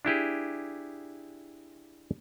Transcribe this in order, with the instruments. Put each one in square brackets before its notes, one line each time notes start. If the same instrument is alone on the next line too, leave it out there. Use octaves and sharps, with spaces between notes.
[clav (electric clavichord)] D4 E4 G4 G#4